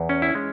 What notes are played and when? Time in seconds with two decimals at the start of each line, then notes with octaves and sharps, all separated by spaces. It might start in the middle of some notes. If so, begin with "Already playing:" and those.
Already playing: E2
0.09 C#4
0.22 E4
0.35 G#3